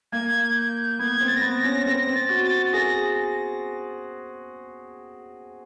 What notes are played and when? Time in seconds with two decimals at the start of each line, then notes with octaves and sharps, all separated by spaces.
0.12 A#3 G#6
0.56 G6
0.99 B3 G#6
1.21 C4
1.27 A6
1.36 A#6
1.42 B3 A6
1.56 A#6
1.64 C#4
1.86 C4 A#6
2.07 C4
2.14 A6
2.29 F#4
2.44 A6
2.65 A6
2.72 G#4 A#6